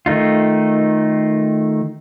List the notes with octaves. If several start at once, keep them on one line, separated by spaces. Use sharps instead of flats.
D#3 A3 D#4 F4